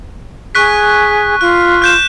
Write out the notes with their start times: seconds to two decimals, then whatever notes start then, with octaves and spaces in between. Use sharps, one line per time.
0.55 G#4 C#6 F#6 B6
1.41 F4 F#6
1.82 F#6 G6 E7